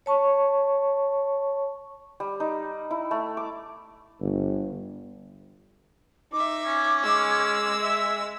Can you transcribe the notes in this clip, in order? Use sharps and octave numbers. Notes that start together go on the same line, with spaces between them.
C#5 A5 C#6
G3
D#4
E4
A3
D6
G1
D#4 E5 D6
C#4
G#3 E6
E5